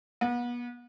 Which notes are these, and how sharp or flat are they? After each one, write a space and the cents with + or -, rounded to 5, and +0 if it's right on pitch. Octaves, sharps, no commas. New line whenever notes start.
B3 -35